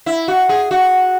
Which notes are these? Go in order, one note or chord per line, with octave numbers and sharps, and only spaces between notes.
E4
F#4
G#4
F#4